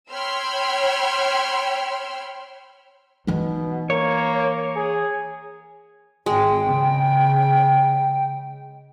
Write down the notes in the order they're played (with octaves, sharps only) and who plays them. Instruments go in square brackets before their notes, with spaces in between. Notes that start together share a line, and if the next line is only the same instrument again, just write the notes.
[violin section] C#5 G5 B5 C6 E6 F6
[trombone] B2 [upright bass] E3 D#4
[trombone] A#3 [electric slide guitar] C#5
[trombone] G#4
[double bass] G#1 [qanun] G#3 [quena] G5
[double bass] C#3